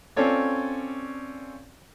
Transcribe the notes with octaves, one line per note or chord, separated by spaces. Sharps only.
C4 C#4 F4 A4 C#5 D5